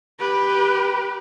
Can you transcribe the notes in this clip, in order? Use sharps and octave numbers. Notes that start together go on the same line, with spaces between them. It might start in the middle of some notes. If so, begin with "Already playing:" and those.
G4 B4